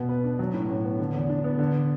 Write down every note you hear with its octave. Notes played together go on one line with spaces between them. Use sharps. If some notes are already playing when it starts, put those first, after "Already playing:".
Already playing: B2 B3
B4
D4
F#3
A2
A2
B3
D3
E2
D4
B3
D3